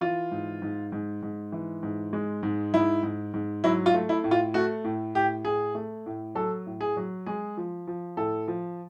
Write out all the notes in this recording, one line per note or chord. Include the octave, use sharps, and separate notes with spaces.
E3 F4
G#2
G#2
G#2
G#2
E3
G#2
G#3
G#2
G#2 E4
G#2
G#2
F#3 E4
F4
A3
E4
A2
F4
A3 F#4
A2
A2 G4
A2 G#4
A3
A2
F#3 A4
A2
G#4
F#3
G#3 G#4
F3
F3
A2 A4
F3